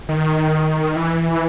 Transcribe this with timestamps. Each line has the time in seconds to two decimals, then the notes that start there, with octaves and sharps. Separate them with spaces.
0.09 D#3
0.96 E3